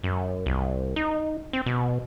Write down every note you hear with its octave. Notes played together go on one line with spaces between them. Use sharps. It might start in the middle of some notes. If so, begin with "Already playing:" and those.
F#2
C2
D#4
C4
B2